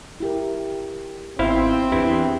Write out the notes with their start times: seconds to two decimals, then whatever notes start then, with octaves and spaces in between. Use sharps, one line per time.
0.20 E4 G4 A#4
1.39 G#1 B3 C4 E4 C5 F5
1.92 E2 D4 E4 G4 B4